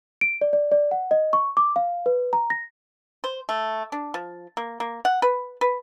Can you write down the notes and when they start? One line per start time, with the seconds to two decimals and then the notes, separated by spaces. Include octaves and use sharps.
0.21 D7
0.41 D5
0.53 D5
0.72 D5
0.91 F#5
1.11 D#5
1.33 C#6
1.57 D6
1.76 F5
2.06 B4
2.33 A#5
2.50 A#6
3.24 C5
3.49 A3
3.92 D4
4.14 F3
4.57 A#3
4.80 A#3
5.05 F#5
5.22 B4
5.61 B4